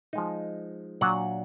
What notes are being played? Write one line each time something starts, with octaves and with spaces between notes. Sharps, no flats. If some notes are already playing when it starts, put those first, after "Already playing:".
F3 G#3 D#4
A#2 F#3 D4 F#5